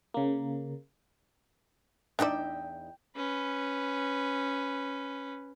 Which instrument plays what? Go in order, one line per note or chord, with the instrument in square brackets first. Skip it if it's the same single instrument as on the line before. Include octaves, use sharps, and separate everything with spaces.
[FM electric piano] C#3 A#3
[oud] E2 D#4 E5 [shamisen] D4 D5 [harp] G5
[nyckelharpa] C#4 B4